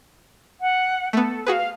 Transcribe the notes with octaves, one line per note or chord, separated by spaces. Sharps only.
F#5
A3 B3 A4
F#4 G#4 B4 F5